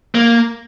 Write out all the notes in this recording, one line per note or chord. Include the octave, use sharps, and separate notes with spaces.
A#3